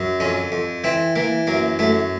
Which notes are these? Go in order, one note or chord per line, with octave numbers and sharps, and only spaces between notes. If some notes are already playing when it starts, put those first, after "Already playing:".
Already playing: F#2
F2 C#4
F2
E3 C4
E3 A#3
F#2 A#3
F#2 A3